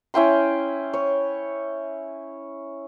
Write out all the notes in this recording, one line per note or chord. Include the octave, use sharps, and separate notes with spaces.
C#4 E4 G5 C6
C#5